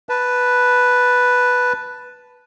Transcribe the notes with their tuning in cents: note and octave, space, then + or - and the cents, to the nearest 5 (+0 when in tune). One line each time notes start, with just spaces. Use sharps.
B4 +0 A5 +0